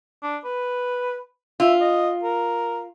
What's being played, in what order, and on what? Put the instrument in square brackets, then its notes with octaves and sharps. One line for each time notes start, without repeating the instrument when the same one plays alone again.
[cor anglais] D4
B4
[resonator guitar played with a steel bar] F4 [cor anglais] E5
[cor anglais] D#5
A#4